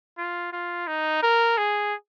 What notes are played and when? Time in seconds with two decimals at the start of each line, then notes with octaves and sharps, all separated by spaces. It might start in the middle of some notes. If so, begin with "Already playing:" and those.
0.18 F4
0.53 F4
0.87 D#4
1.23 A#4
1.58 G#4